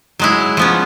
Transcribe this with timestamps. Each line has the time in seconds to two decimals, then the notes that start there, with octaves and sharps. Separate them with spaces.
0.19 F#3 G#3 E4
0.57 F3 B3 C#4